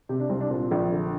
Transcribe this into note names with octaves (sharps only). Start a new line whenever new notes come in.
C3 G4
D4
C2 C4
D4
A#2 C4
A#1
D3